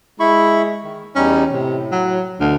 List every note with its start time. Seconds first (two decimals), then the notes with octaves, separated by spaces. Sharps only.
0.20 G#3 E4 B5 C#6
0.84 D#3
1.15 E2 G3 C#4 D#4
1.52 A2 C3
1.91 F#3
2.40 D2 B2 D3 F6